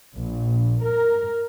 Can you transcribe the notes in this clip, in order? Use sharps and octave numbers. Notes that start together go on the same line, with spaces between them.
A#1
A#4